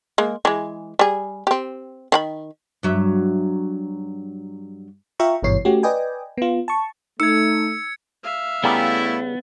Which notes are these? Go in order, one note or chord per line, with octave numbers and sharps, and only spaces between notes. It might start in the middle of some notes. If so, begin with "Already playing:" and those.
G#3 A#3
E3 G#3
G3 G#4
C4 G4
D#3 F#5 B5
G2 F#3 E5
F4 E5 F5 G5 A#5 C#6
G#1 G2 B2 E3 C#5 C7
A3 C#4 F#4 G4
B4 D5 D#5 G5 G#5
B3 F4
A5 C#6
A3 D#4 E6 G#6 C#7
E5 F5
C#3 G3 A3 B3 E4 A#5